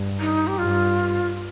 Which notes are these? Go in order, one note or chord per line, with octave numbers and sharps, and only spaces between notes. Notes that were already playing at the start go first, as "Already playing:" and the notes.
Already playing: G2
D#4
G4
G2 F4